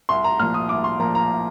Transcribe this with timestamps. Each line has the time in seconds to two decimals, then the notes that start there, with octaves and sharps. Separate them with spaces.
0.09 C2 C6
0.24 A#5
0.40 A#2 F3 F6
0.54 D#6
0.69 C2 D6
0.84 C6
1.00 A#2 F3 A#5
1.15 A#5